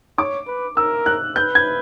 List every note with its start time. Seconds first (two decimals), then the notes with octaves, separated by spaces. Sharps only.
0.18 C#5 D6
0.47 B4
0.77 A#4 E6
1.06 F#6
1.36 B4 G6
1.55 G#6